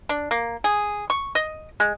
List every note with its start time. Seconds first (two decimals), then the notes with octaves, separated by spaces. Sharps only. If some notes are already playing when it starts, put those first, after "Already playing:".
0.09 D4
0.31 A#3
0.64 G#4
1.10 C#6
1.35 D#5
1.80 G#3